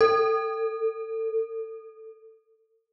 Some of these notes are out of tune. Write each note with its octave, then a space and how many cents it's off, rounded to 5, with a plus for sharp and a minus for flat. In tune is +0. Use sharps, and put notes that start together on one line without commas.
A4 +25